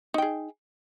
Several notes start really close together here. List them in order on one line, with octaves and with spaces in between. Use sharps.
D#4 G5 G#4